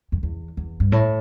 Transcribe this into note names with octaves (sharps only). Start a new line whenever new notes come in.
F2
E2
E2
G2
A2